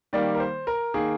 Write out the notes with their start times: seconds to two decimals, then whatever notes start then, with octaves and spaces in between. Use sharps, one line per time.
0.13 D#3 G3 A#3 D5
0.35 A#4
0.40 C5
0.67 A#4
0.94 D#3 A#3 G#4